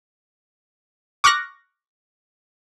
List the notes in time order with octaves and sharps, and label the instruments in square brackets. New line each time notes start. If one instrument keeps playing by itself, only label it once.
[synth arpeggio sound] C#6 D6 F6 F#6 A#6